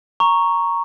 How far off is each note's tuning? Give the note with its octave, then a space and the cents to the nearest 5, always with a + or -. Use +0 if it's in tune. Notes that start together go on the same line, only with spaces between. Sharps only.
A#5 +0 C#6 +0